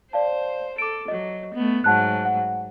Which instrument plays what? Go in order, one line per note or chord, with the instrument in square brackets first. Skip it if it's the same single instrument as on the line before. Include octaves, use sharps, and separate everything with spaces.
[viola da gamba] C5 [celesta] D5 F5 A5
[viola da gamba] A4 [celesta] D6 D7
[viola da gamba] F#3 [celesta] D#5
[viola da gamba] A3 B3
[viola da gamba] G#2 F#3 [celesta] F#5 A5 F#6
[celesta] F#5